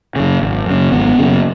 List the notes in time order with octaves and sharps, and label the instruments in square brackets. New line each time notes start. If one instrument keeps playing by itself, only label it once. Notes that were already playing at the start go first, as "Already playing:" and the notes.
[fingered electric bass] F#2 C#3
G#1
F#2 C#3
G#1 B3
F#2 C#3